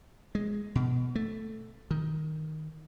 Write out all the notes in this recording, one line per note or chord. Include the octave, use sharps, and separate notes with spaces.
G#3
B2
A3
D#3